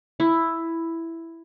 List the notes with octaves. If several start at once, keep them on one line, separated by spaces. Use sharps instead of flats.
E4